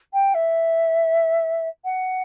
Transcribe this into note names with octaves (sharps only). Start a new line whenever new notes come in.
G5
E5
F#5